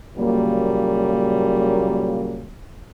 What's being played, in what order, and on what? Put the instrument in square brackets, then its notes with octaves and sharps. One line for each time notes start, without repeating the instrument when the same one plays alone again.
[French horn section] A#2 C#3 F#3 G3 A#3